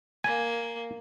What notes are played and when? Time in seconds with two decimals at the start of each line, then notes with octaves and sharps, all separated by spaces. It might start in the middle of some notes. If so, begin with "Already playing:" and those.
0.24 A#3 G#5